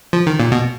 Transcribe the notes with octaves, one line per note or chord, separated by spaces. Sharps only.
F3
D#3
A#2
B2